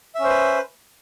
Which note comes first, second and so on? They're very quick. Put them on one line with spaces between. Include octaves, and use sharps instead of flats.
E5 C#4 C5 B4